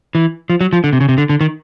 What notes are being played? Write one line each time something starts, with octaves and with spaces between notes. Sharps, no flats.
E3
F3
F#3
F3
D3
C3
C#3
C3
D3
D3
D#3